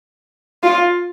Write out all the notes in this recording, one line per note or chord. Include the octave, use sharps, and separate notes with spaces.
F4